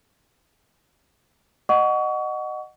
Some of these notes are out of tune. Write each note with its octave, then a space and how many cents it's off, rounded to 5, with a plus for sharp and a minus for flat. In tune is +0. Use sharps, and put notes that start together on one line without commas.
D#5 -20 F#5 +0 C#6 +30